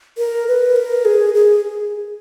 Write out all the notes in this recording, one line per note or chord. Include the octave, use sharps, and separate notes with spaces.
A#4
B4
A#4
G#4
G#4